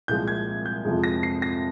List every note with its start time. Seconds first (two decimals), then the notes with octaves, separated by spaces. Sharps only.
0.08 C2 A#2 F3 G#3 G6
0.28 G#6
0.66 G6
0.85 F2 C3 F3 G#3
1.04 A#6
1.23 C7
1.42 A#6